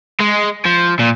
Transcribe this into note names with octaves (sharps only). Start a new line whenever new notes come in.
G#3
F3
A#2